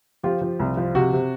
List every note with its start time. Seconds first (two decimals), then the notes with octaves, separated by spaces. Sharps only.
0.23 F3 F4 G4
0.42 F3
0.60 C2
0.77 F3
0.95 C3 F#4
1.13 C3